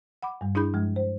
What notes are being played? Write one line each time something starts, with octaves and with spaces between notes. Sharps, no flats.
F#5 B5 D6
G2 G3
D4 E4 G#4 B5 G6
G2 F3 G#3
C5